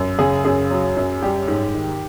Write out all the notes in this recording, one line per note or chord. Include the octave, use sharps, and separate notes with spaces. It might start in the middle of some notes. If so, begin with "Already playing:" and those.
Already playing: F#2
C#3 G#4
F#2 G#4
F#3
F#2
G3 G4
G#2
D#3